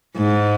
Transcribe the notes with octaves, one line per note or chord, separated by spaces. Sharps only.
G#2